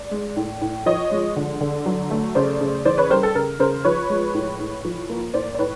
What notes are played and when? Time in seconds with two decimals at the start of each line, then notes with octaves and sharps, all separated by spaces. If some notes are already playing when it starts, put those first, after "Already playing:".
Already playing: D5
0.11 G#3
0.37 A2
0.61 A2
0.86 F3 C#5 D#5
1.11 G#3
1.36 D3
1.61 D3
1.86 F#3
2.11 A3
2.35 C#3 C5 D5
2.61 C#3
2.85 E3 C5 D5
2.98 B4 C#5
3.10 G3 A#4 C5
3.23 A4
3.35 C#3 A#4
3.59 C#3 A#4 C5
3.85 F3 B4 C#5
4.10 G#3
4.35 A2
4.60 A2
4.85 F3
5.09 A#3
5.34 A2 C5 D5
5.55 D5
5.59 A2 B4 C#5